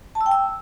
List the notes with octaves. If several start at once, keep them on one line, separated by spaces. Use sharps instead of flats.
A5
E6
G5
E6